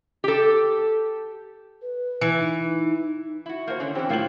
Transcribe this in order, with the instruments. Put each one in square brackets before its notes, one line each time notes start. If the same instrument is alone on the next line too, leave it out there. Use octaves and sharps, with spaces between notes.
[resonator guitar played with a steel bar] G4 A4
[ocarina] B4
[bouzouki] E3
[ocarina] D#4
[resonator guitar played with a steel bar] E4 F#4
[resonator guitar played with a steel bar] A#3 F#4 [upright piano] C5 G6
[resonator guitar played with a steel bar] D3 C#4
[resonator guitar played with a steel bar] E3 C#4 [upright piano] C4 G4 C5
[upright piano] A2 G5 F#7 [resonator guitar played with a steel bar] F#3 A#3 F4